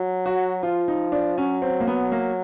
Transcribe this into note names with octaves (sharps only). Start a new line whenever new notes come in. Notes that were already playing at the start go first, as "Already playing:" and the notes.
Already playing: F#3
F#4
F3 F4
D#4
D4
F#3 C#4
C4
A#3
B3
A#3